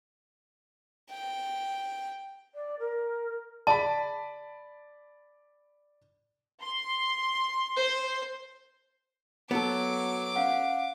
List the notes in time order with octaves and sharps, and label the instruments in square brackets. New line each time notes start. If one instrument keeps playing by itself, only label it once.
[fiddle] G5
[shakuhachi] D5
A#4
[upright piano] D5 B5 [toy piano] A5
[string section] C6
[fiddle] C5
[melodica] F#3 [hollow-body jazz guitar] B3 A4 [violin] D6
[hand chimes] C#4 F5 F#5